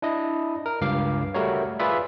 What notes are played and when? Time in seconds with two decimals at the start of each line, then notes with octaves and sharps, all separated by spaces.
0.02 D4 E4 D#5
0.66 A#4
0.81 C#2 G2 F5 D6
1.34 G3 A3 F#4 A#4 C#5
1.79 F4 G#4 B4 D5 E5 B5